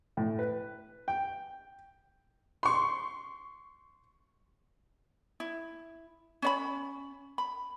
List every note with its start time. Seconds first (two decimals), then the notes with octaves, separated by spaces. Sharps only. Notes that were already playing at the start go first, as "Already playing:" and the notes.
0.17 A2
0.39 B4
1.08 G5
2.63 C6 C#6
5.40 E4
6.42 C#4 D5 B5
7.38 B5